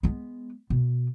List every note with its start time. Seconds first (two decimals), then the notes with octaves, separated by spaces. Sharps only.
0.03 G#3 B3
0.70 B2